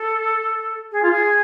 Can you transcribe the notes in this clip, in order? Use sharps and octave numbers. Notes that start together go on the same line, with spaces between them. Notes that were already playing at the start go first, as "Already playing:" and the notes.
Already playing: A4
G#4
F4
G#4